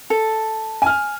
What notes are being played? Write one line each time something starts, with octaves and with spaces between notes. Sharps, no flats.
A4
G#5 F6